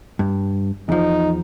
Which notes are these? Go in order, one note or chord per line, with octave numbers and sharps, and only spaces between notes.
G2
E2 F3 D#4